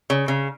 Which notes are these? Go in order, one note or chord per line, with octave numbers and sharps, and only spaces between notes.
C#3
C#3